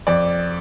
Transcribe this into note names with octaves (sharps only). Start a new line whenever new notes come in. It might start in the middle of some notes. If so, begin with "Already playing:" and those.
F2 D5